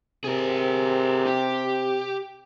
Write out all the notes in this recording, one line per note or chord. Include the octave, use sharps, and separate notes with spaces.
C3 G#4 A#4
G4